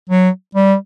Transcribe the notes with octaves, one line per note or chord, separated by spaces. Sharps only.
F#3
G3